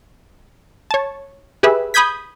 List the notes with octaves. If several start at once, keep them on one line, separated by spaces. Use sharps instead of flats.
C#5 A5
G4 G#4 B4 E5
B5 D#6 G6 G#6 B6